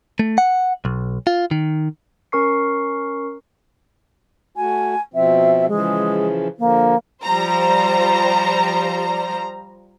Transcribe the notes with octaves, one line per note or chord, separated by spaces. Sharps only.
A3
F#5
B1
F4
D#3
C#4 A#4 C#6 C7
A3 F#4 G#5
B2 F3 C4 E5
C#3 E3 F3 G#3
D3 F3 A#3
F3 G3 C5 A#5